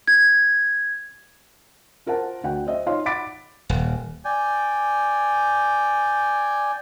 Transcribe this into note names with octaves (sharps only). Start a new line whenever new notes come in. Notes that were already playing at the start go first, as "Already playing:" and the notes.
G#6
F4 A#4 C5 F#5 A5
D2 F#5 G5
C5 D#5 E5
D#4 F4 C#5 D#5 F5 C6
F#5 B5 D6 A6 B6 D7
D#1
D5 G5 G#5